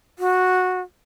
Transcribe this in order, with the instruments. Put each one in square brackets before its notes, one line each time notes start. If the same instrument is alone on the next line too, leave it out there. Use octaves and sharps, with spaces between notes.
[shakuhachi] F#4